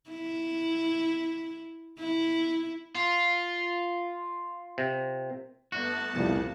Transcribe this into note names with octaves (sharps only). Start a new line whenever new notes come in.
E4
E4
F4
C3
G1 A3 B3 F#4 A5 F#7
C2 F2 A#2 C#3